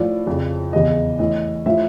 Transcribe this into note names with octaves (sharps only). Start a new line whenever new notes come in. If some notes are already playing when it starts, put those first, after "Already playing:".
Already playing: A2 F3 D5
F2 C#3 F3
E2 C#3 E3 D#5
A2 E3 D#5
A2 F3 E5